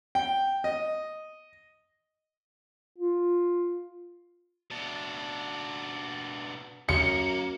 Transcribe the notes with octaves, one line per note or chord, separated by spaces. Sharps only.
G5
D#5
F4
B2 D4
F#2 A#3 C#7